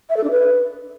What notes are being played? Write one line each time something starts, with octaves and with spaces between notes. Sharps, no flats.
E5
A4
D4
B4